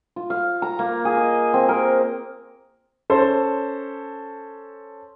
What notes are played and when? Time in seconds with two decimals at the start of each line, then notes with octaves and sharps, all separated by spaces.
0.16 F4
0.30 F5
0.62 A#5
0.79 A#3
1.05 G#4
1.17 D#5
1.54 C4
1.69 A#4
3.10 C#4 A4 C5